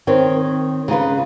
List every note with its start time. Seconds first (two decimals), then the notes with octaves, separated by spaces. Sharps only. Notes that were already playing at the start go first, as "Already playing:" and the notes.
0.07 D#3 C4 C#5
0.88 C#3 D#4 F4 B4